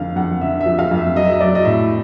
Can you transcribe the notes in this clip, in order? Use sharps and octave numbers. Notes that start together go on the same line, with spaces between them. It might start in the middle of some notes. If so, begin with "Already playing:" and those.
Already playing: F2 D3 F5
F2 F#5
D3 E5
E5
F3
F5
F2
E5
F#3 D#5
E5
D#5
F#3 D5
D#5
A2 E5